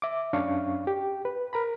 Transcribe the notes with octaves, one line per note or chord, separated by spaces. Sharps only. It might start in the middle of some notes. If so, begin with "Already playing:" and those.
E5 D6
F#2 C#4 D4 F5 C#6
G4
B4
A#4 A#5 B5